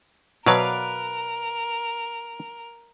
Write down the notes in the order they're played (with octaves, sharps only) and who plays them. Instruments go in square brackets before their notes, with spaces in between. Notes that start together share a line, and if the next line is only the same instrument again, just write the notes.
[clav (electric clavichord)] B2 F#3 [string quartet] A#4 [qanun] B4 D5 F5